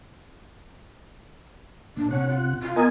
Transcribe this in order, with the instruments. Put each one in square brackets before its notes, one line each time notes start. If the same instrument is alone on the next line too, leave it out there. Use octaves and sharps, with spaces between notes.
[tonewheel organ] A#2 [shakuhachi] D4
[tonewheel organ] C3 F#5 [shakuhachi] C#5
[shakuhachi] F4
F4
[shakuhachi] B3 [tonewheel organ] A#4 D#5 G#5